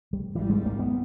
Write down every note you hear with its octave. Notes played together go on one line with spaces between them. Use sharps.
G3
G#1 G#2 E3 G3
G#3
A#3
B3